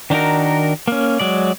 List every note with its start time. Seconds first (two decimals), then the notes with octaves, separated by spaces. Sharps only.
0.10 D#3 D4 D#4 F#4 A#4
0.88 A#3 C#4
1.20 F#3 G#3 D5